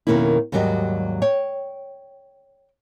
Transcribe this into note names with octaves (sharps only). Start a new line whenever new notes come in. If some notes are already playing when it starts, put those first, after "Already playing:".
F2 B2 D#3 A#3 C#4 E4
D#2 G#2 F#3 G3 G4 D#5
C#5 G5